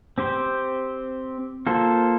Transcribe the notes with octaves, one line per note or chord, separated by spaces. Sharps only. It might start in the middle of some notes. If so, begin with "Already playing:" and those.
C4 G4 C5
A#3 F4 A4 C5